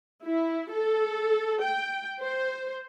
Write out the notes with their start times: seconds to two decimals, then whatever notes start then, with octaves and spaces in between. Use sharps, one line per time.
0.24 E4
0.71 A4
1.60 G5
2.20 C5